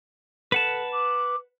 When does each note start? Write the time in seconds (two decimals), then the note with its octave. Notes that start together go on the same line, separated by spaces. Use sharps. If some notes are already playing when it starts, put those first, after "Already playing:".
0.52 A4 B4 F#5 A5
0.92 D6